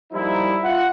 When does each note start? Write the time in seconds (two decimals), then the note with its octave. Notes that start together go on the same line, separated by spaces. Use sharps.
0.12 F3 G3 A#3 D#4 E4
0.62 F4 E5 F#5